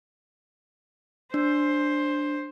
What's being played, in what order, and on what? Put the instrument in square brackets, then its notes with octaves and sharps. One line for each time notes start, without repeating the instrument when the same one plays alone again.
[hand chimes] D4 [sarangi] C5